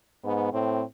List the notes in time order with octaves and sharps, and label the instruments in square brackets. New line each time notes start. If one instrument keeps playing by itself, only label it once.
[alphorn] G#2 [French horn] B3
[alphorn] A2 [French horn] C4